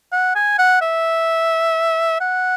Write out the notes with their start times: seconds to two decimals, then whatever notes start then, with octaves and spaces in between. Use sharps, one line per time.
0.12 F#5
0.35 G#5
0.58 F#5
0.81 E5
2.20 F#5